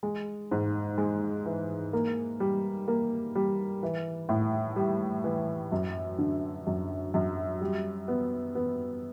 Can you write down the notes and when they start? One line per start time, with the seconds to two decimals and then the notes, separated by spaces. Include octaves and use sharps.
0.03 G#3
0.51 G#2
0.98 G#3
1.46 E3
1.93 A#3
2.40 G3
2.88 A#3
3.35 G3
3.83 E3
4.29 A2
4.76 G3
5.24 E3
5.72 F#2
6.18 D3
6.67 F#2
7.14 F#2
7.61 G3
8.08 B3
8.55 B3